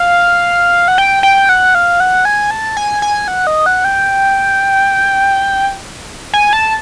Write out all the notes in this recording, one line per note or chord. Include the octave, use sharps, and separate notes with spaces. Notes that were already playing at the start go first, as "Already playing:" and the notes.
Already playing: F5
F#5
G5
G5
F#5
F5
F#5
G#5
A5
G#5
G#5
F#5
D#5
F#5
G5
G#5
A5